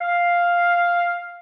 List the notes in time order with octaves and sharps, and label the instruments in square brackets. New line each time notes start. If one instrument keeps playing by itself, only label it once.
[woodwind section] F5